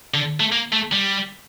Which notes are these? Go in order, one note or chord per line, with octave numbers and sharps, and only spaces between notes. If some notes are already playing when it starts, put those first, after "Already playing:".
D3
A3
A#3
A3
G3